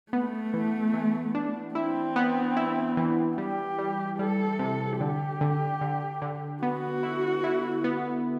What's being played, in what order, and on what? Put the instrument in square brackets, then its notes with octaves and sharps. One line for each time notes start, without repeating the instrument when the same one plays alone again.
[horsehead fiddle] A3 [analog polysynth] B3
[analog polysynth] E3
E3
D4
[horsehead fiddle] C4 [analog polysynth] E4
[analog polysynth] B3
E4
E3
[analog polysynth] G3 [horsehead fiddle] G4
[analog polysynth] G3
[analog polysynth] G3 [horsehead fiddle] A4
[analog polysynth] C3
[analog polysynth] D3 [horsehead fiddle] G4
[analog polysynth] D3
D3
D3
[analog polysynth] B3 [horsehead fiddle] F#4
[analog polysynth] E4
E4
B3